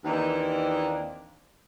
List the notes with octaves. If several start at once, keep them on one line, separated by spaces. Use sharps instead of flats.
D#2 E3 A#3 C4 D4 D#4